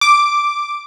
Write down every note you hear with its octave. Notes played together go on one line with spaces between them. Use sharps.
D6